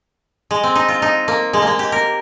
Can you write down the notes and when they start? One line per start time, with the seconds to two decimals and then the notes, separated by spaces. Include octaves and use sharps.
0.51 G#3
0.64 C4
0.75 D#4
0.88 F4
1.02 D#4
1.28 A#3
1.53 G#3
1.62 A#3
1.67 G#3
1.79 G4
1.92 A#4